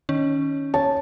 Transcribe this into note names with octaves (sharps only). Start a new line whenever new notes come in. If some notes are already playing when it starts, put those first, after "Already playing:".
D#3 C#4
C#5 A5